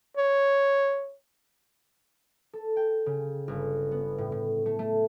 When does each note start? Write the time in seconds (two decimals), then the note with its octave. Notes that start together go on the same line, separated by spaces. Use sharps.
0.17 C#5
2.53 A4
2.77 G5
3.06 C#3
3.48 G1
3.91 B3
4.18 A2
4.32 A2
4.66 A3
4.79 A3